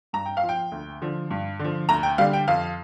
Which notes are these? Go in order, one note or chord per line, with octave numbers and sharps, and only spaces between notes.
G2 A#5
G5
F5
F3
G5
D2
D3 F3
G2
D3 F3
D2 A#5
G5
D3 G3 F5
G5
F2 F5